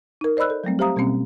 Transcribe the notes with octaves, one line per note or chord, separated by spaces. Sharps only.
D#4 A#4
C5 D5 D#5 B5 E6 F#6
A4
F#3 G3 A3 C4
G4 C5 E5 F5 A#5 D#6
B2 G3 A#3 C4 C#4